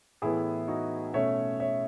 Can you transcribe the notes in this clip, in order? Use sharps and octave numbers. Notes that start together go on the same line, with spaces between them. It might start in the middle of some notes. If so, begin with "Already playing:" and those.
A2 E3 B3 E4 G#4
D#4 F#4
B2 A3 C#4 C#5 E5
C#5 E5